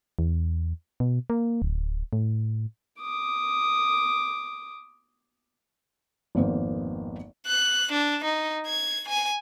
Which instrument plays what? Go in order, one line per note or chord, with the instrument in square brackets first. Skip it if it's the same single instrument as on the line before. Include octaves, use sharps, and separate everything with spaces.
[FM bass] E2
B2
A#3
D1
A2
[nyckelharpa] D6 D#6
[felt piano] G#1 F2 A#3 B3 C5
[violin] F#6
D4
D#4
G#6
G#5